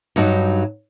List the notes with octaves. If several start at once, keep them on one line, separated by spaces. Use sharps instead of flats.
G2 F#3 D#4